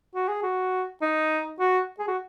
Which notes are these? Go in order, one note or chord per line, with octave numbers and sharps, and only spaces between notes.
F#4
G#4
F#4
D#4
F#4
G#4
F#4